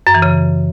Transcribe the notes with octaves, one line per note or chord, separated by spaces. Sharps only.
F#2
E3
C#3